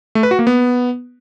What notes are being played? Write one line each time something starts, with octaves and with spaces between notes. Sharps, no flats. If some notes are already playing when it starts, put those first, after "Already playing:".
A3
B4
F#4
A#3
B3